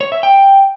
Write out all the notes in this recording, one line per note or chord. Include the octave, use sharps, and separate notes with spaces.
C#5
E5
G5